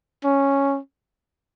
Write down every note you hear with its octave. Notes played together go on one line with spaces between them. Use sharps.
C#4